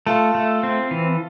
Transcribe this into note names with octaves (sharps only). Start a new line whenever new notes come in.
A3 F4 A4
A3
C4
E3